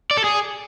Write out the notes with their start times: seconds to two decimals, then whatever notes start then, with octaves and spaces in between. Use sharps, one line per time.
0.11 D5
0.17 A4
0.24 G#4